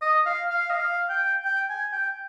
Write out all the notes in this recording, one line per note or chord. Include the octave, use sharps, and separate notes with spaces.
D#5
F5
F5
D#5
F5
G5
G5
G#5
G5